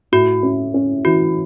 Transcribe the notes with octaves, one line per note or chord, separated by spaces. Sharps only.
A2 F#4
C#4
C#4
E3 F#4